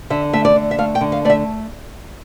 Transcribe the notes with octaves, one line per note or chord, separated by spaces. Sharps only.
D3 E5
A3 E5
D5
D3
E5
A3 F5
G5
D3
F5
A3 D5 E5